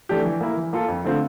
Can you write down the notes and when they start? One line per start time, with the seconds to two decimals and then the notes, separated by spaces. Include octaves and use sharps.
0.09 E3 A3 D4 G4
0.26 E3
0.41 A#3 E4 A#4
0.57 E3
0.73 A#3 F4 A4
0.88 F2
1.04 D3 A3 C4 F4